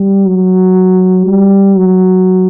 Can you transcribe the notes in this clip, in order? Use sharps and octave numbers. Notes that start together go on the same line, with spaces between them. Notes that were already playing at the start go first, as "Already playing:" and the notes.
Already playing: G3
F#3
G3
F#3